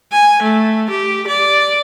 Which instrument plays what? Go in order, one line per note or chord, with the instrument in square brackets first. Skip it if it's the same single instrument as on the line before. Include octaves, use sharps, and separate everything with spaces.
[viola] G#5
A3
G4
D5